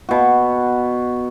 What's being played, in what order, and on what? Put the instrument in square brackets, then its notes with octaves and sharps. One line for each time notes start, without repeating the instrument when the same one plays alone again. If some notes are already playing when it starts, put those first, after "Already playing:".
[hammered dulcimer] B2 F#4